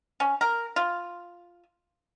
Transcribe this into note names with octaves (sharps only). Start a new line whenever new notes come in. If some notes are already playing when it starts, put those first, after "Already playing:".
C#4
A#4
F4